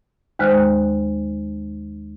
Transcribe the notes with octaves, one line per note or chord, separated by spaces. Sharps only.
D#2 D#3 G#3 C5 F6 F#6